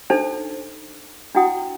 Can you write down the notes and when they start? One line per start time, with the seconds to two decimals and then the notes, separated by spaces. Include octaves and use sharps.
0.10 D4 D#4 A4 C5 A5
1.35 D4 E4 F#4 F#5 G5 D#6